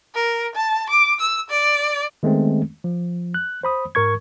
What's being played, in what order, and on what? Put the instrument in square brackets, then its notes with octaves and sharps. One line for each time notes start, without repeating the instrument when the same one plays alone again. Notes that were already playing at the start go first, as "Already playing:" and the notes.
[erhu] A#4
A5
D6
E6
D5
[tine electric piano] D#3 G#3 A3 B3 C4
F3
F#6
C5 B5 D#6
G#2 A#4 C#6 G#6